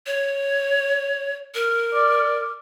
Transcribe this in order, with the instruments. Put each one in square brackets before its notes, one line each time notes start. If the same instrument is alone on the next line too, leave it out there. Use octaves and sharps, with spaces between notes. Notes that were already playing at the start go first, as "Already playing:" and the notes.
[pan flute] C#5
A#4
[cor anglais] D5